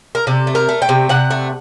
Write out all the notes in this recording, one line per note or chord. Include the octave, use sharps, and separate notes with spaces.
A#4
C3 A4
A3
A#4
A3
G5
C3
C3 F#5
A3